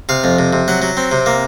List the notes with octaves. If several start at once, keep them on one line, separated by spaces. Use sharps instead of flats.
C3 F5
F2
C3
C3
F#3 F#5
F#3
C4
C3
A#3